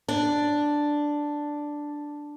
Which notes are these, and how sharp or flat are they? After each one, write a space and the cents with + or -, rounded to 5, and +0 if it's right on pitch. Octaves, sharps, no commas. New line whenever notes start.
D4 +0